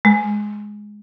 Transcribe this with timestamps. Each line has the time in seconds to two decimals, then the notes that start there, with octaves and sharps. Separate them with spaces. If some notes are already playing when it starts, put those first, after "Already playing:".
0.05 G#3